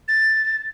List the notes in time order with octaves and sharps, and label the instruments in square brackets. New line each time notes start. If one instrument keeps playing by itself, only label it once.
[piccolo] A6